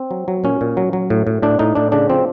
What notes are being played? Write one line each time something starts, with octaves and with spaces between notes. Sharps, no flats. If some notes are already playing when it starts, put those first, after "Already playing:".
Already playing: C4
F#3
F#3
A#2 C#4
A#2
F#3
F#3
A2
A2
A2 D4
A2 D#4
A2 D4
C#3 D4
F3 C4